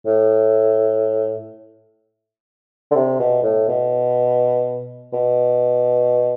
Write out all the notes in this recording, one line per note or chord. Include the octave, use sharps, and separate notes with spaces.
A2
D3
C3
B2
A2
B2
B2